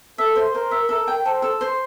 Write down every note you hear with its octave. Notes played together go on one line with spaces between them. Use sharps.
A4 E5
C5
A#4 C5
E5
A4 A#4
G5
A4 C5
A4
C5